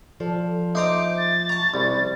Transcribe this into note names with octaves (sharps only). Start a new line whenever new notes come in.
F3 A4 D5
D#4 C5 E5 A#5 D6
A6
A5 A#5 C#6
C2 D5 B5 C#6